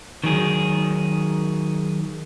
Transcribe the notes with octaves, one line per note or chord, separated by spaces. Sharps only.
D#3 F#3 G#4